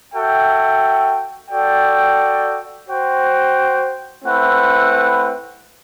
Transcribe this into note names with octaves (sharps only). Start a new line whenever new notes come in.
F#4 A4 E5 G5
F#4 A4 D5 G5
F#4 C5 G5
A3 C4 E4 B4 F#5